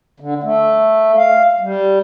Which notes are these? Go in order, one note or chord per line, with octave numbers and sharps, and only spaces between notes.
D3
A3
F5
G3